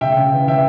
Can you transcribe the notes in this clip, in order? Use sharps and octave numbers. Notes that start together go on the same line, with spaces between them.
C#3 E5 G5
C#3
E3
E3 E5 G5